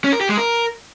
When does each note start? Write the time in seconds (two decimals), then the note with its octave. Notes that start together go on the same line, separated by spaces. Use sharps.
0.04 C#4
0.13 A#4
0.21 G4
0.29 G#3
0.38 A#4